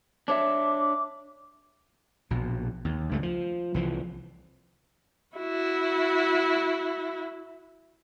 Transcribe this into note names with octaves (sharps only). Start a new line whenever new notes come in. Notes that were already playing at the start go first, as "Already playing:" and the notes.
D4 C#5 E5 D6
A#1 B2
D#2
C#2 G2 A3
F3
C2 E3 F3
E4 F#4